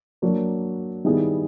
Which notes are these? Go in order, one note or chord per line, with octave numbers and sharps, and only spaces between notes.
F#3 A#3 D4 F#4
D#3 G3 B3 E4 G#4